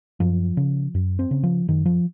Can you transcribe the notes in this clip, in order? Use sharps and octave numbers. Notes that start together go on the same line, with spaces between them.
F#2 F3
C#3
F#2
C4
C#3
F3
F#2 D#3
F3